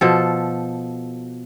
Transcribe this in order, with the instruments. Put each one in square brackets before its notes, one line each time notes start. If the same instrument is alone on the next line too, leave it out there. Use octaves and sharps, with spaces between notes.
[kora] B2 F3 A4